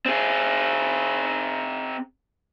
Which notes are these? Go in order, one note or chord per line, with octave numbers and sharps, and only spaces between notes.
C4 G#4